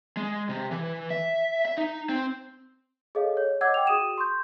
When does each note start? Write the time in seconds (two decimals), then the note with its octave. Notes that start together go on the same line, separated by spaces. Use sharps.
0.17 G#3
0.49 C3
0.71 E3
1.10 E5
1.65 E5
1.78 D#4
2.09 C4
3.15 G#4 A4 C#5 D#5 F5
3.37 C#5
3.61 C#5 D#5 F#5 D6 E6 G#6
3.74 G5 D6 F7
3.87 F#4 G#4 D#6 D#7 E7
4.18 C6 C#6 G6